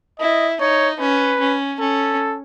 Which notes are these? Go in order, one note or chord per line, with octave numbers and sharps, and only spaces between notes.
E4 D#5
D#4 C#5
C#4 B4
C#4
C#4 A4